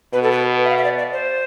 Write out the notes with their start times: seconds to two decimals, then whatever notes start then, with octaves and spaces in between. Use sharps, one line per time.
0.13 B2 B4
0.23 A4
0.32 B4
0.65 E5
0.70 F5
0.78 E5
0.84 D5
0.98 D5
1.13 C5